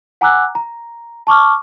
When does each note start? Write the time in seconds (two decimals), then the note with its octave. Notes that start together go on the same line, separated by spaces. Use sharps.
0.21 F#5 G#5 A#5 D6 E6 F#6
0.55 A#5
1.27 A5 C#6 D6 F6